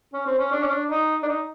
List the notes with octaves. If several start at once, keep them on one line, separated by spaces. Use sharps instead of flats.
C#4
C4
C#4
D4
C#4
D4
D#4
D4
D#4